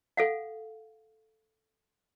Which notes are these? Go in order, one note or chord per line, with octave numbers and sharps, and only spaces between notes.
A4 F5 F#5